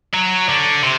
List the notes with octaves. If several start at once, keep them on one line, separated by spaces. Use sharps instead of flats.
F#3
D3
C3